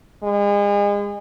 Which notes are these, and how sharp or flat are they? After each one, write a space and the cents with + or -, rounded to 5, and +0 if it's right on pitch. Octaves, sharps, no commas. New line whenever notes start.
G#3 -35